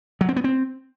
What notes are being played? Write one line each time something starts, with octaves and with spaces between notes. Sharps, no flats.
F#3
C4
B3
C4